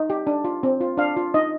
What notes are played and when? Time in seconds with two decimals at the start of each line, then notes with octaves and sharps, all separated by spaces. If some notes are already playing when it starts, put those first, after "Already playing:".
Already playing: D#4
0.10 G4
0.27 D4
0.44 F4
0.63 C4
0.81 F4
0.98 D4 F5
1.17 F4
1.34 D#4 D#5